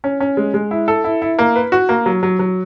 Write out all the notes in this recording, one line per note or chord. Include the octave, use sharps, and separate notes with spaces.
C#4
C#4
G#3
G#3
E4
A4
E4
E4
A#3
B4
F#4
A#3
F#3
F#3
F#3